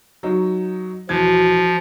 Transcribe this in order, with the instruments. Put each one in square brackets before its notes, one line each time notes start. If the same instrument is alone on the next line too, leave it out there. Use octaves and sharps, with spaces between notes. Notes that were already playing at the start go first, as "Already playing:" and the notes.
[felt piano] F#3 D#4 F#4
[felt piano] E1 E3 G#6 [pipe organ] F3 [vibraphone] F#4